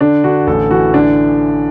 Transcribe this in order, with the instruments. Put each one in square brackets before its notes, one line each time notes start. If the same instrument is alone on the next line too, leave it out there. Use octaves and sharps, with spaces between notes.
[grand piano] D3 D4
D3 F#4
A1 A4
E3 F#4
D3 D4